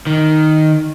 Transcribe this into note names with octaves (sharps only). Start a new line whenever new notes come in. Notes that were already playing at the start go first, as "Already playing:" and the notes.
D#3